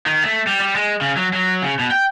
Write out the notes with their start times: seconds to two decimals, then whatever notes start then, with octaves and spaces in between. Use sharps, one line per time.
0.06 D#3
0.24 A3
0.47 G3
0.60 G3
0.76 G#3
1.01 C#3
1.16 F#3
1.33 F#3
1.62 C#3
1.79 B2
1.91 G5